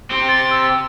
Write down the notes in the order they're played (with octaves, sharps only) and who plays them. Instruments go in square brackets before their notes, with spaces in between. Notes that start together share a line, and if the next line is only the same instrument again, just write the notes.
[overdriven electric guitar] C4 G4
[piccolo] A6
E6